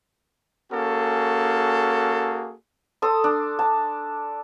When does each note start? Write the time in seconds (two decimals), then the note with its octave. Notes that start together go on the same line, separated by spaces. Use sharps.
0.72 A#3 C#4 F#4 G#4 A4
3.02 A4 C6 D#6
3.24 D4
3.59 A5